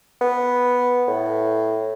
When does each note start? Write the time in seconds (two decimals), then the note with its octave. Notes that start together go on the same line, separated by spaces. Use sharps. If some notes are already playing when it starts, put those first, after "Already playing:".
0.21 B3
1.07 A2